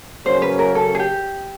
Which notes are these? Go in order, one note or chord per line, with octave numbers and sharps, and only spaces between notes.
C#3 F#3 A#3 C#4 C5
B4
A#4
A4
G#4
G4